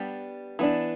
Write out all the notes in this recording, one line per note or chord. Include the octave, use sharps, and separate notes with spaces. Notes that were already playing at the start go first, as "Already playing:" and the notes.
Already playing: G3 B3 D4 G4
E3 B3 D4